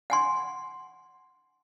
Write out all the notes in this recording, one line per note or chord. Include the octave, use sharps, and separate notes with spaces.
F#5 G#5 C6